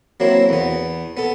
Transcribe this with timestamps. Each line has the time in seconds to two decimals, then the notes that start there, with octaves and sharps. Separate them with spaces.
0.20 F#3 A#3 C4 E4
0.49 E2 B3
1.17 B3 A4